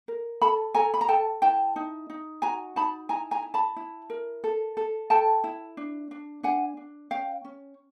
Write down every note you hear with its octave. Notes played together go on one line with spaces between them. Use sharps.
A#4
A4 A5 B5
A4 G#5 A#5
B5
A#5
A4 G5 A5
E4 G5 A5
D#4
D#4
F#4 G#5 A#5
D#4 A5 B5
E4 G#5 A#5
G#5 A#5
E4
A5 B5
E4
A#4
A4
A4
A4 G5 A5
E4
D4
D4
D4 F#5 G#5
D4
C#4 F5 G5
C#4